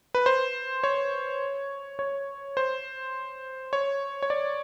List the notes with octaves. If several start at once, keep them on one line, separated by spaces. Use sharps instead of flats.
B4
C5
C#5
C#5
C5
C#5
C#5
D5